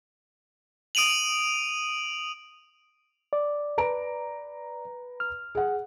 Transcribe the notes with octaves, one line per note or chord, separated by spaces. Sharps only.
D#6 D7 D#7 F7 F#7
D5
B4 A#5 D7
F6
G#4 F#5